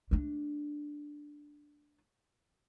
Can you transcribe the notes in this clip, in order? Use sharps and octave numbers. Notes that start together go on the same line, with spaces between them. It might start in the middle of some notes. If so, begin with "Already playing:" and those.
A3 D4